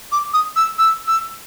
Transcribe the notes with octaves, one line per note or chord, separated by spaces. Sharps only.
D6
D#6
E6
E6
E6